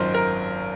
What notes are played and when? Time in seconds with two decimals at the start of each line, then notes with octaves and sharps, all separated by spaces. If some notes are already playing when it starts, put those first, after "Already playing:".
Already playing: G#1 F#2 D#3 F4 A#4 C5
0.14 A#4